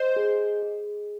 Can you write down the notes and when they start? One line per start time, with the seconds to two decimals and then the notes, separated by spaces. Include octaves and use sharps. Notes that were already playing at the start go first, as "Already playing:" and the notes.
Already playing: C5 D#5
0.16 G#4
0.62 G#4